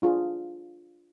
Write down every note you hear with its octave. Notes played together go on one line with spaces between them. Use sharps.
D4 F4 G#4